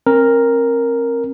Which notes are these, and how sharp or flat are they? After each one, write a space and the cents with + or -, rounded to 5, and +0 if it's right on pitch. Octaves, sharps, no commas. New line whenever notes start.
C4 +40 A#4 +0